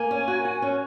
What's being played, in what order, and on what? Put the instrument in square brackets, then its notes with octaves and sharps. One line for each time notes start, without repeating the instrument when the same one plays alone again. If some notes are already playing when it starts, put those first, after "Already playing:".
Already playing: [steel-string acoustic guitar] A#3 [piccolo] G#5
[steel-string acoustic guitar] C#4
F#4
F#4
C#4